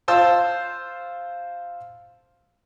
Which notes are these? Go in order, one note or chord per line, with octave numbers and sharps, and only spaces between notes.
F4 C5 A5 E6